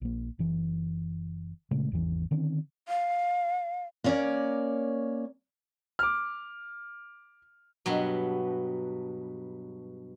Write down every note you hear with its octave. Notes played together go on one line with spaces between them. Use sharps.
A#1 A#3
F#1 E3
A#2 C#3 G#3 A3
G#1 E2 E3
D3 D#3 C4 C#4
F5
A#3 B3 C#4 A#4 C#5 D5
D6 F6
G2 B2 F#3